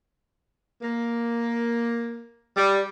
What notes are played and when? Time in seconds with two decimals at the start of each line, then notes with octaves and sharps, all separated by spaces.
0.82 A#3
2.57 G3